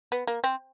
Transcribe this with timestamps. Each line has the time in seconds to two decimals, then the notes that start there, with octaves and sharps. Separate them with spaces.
0.12 B3
0.27 A#3
0.44 C4